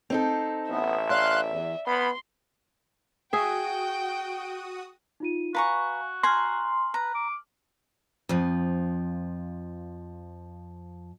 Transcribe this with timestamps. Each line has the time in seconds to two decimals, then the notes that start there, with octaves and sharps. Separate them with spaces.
0.10 C4 D#4 A4
0.70 A1 B3 E5
1.10 D5 F5 C6 F#6
1.49 E2
1.87 B3 B5 C6
3.33 F#4 G#4 E5 G5 D#6
5.20 D#4 F4 D#7
5.55 F#4 B4 F5 G#5 A#5 C#6
6.23 G#5 A#5 C6 F6 F#7
6.94 B4 A#5
7.15 D6
8.29 F2 F3